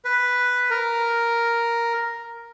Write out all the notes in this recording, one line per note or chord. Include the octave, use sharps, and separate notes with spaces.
B4
A#4